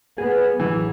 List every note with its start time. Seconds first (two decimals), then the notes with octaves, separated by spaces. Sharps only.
0.18 B3 G#4
0.60 A1 E3 F#3